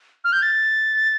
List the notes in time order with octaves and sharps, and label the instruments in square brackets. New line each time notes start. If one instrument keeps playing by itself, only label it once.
[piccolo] F6
G6
A6